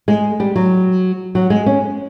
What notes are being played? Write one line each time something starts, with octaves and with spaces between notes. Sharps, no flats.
G#3
G3
F#3
F#3
G#3
C#4